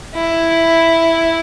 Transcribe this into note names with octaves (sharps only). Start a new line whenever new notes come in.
E4